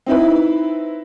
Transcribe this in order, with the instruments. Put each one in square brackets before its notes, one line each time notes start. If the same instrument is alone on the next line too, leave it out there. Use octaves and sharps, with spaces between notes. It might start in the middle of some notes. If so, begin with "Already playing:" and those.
[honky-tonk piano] C4 D#4 E4 B4